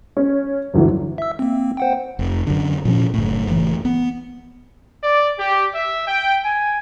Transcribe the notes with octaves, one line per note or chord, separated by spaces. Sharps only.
C#4
G1 D2 E3 F#3
E5 E6
A#3 C4
C5 F#5 G5
F1
F#2 D3
A#2 F3 C#4
F#1 A2
F#1 A2 E3
B3
D5
G4
E5
G5
G#5